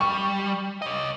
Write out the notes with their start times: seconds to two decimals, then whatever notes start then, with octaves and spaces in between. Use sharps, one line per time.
0.01 G3 C#6
0.82 C#5 D#5